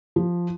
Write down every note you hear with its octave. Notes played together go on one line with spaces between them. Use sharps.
F3